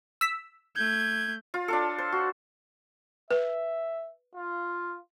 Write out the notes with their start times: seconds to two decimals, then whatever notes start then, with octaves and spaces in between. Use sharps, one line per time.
0.21 E6 B6
0.76 A3 G6 G#6
1.54 F4
1.68 D4 F4 A4
1.98 C5
2.12 F#4
3.31 B4 E5
4.36 F4